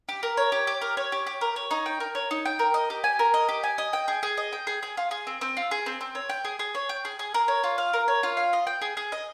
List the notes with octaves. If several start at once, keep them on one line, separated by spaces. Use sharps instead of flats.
G4
A#4
C#5
G4
G4
A#4
C#5
G4
G4
A#4
C#5
D#4
G5
A#4
C#5
D#4
G5
A#4
D#5
G4
G#5
A#4
D#5
G4
G#5
D#5
G5
G#4
G#4
D#5
G5
G#4
G#4
F4
G#4
C4
C4
F4
G#4
C4
C4
C#5
G5
G#4
G#4
C#5
G5
G#4
G#4
A#4
C#5
F4
F5
A#4
C#5
F4
F5
D#5
G5
G#4
G#4
D#5